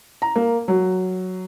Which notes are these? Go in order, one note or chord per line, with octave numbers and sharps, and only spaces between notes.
A#5
A#3
F#3